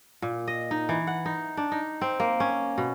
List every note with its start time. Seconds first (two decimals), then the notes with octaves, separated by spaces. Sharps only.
0.22 A#2
0.47 D#5
0.71 D#4
0.89 E3
1.07 F#5
1.26 D#4
1.57 D4
1.72 D#4
2.01 C4
2.20 A#3
2.40 C#4
2.78 B2